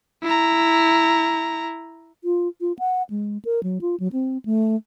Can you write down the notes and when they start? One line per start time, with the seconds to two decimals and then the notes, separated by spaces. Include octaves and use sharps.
0.23 E4 A#5
2.24 F4
2.61 F4
2.79 F#5
3.10 G#3
3.45 A#4
3.63 F#3
3.81 F4
4.00 F#3
4.13 C4
4.45 A3